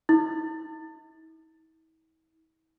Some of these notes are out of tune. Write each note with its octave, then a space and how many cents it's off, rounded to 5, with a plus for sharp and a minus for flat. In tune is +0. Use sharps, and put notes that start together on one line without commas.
E4 -45